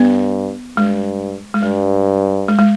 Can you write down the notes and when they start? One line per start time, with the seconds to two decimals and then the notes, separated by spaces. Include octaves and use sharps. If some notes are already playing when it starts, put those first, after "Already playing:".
Already playing: G2 B3
0.77 G2 G#3
1.54 G#3
1.62 G2 G3
2.48 G#3
2.59 G#3